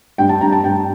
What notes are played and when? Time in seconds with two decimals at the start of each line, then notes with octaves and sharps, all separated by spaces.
0.18 G2 G5
0.29 A5
0.41 G2 A#5
0.52 A5
0.64 G2 G5